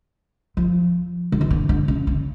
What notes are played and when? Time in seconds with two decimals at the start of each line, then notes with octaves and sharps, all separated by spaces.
0.57 F3
1.32 D3
1.41 D#3
1.51 D3
1.69 D3
1.88 C#3
2.07 C#3